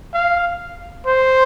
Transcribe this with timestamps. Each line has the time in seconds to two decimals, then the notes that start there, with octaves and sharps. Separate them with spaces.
0.14 F5
1.06 C5